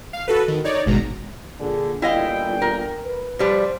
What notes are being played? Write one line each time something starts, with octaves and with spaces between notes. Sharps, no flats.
F5
F#4 A4 B4
D#3
D#4 C#5 D5
G#1 G#2 B2 A#5
A#2 D3 G#4
G1 A#2 E4 D#5 F5 G5
A#4
B4
F3 G3 B4 C5